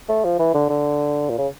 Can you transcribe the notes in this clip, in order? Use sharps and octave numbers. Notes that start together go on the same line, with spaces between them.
A3
F3
E3
D3
D3
A#2
C#3